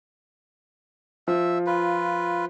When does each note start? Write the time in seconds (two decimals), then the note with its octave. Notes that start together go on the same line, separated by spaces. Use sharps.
1.28 F3 E5
1.67 F4 B4